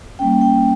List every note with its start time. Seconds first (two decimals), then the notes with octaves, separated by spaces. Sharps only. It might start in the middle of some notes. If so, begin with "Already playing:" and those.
0.19 G3 A#3 C#4 G5
0.41 G5